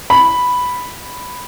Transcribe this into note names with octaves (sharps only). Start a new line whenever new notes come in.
B5